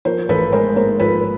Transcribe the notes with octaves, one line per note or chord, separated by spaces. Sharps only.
F3 A#4 C5
A1 A4 B4
G#3 A#4 C5
G#2 A#4 C5
F3 A4 B4